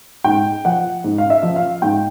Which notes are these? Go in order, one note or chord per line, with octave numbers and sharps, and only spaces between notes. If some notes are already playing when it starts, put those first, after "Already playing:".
G#2 G5
F3 F#5
G#2
F5
E5
F3
F5
G#2 G5